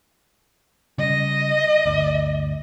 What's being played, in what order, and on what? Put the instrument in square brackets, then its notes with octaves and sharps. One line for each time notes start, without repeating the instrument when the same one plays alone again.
[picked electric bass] C#3 G3 [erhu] D#5
[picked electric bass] G1 D2